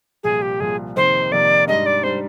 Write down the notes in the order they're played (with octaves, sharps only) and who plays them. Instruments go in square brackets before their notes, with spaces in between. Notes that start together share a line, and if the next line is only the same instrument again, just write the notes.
[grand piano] C2 A#2 F3 [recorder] G#4
[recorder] G4
[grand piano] C2 A#2 F3 [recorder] G#4
[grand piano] F2 C3 D#3 A#3 [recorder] C5
[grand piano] F2 C3 D#3 A#3 [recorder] D5
[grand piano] G#2 G3 D4 [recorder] D#5
[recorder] D5
[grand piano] G3 D4 [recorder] C5